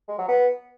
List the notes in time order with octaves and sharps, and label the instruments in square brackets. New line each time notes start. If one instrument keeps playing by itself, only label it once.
[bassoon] G#3
F#3
B3